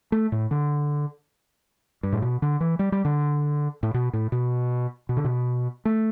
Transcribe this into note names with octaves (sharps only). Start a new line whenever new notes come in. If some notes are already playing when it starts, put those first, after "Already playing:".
A3
A2
D3
G2
A2
B2
D3
E3
G3
G3
D3
A2
B2
A2
B2
B2
D3
B2
A3